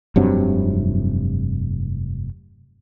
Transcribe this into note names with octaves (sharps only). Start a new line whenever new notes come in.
F1 G2 C3 F#3